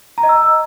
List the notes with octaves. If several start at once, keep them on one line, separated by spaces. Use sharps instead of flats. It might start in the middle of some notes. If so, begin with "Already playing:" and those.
A#5
D#5
E6